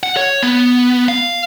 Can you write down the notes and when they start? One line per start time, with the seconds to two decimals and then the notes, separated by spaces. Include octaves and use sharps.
0.03 F#5
0.17 C#5
0.43 B3
1.08 F5